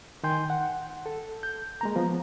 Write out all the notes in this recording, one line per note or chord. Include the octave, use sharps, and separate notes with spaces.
D#3 G5 G#5 C6 G6
F#5
A4
G6
G#3 A#3 A#5
F3 B3